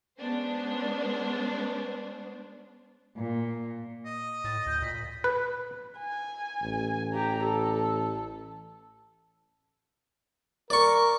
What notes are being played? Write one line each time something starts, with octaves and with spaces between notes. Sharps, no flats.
G#3 B3 C#4 D4 C5
A#2
D#5
A2 A6
D2 G6
A#2 B6
B4
G#5
A1
G4 A#5
A4
A#4 D5 C#6